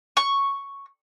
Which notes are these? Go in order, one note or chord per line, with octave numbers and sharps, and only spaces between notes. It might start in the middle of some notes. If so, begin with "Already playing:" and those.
C#6